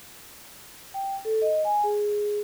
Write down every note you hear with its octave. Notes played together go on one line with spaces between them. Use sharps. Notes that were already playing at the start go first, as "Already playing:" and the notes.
G5
A4
D#5
G#5
G#4